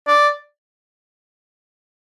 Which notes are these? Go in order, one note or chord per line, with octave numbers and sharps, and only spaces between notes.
D5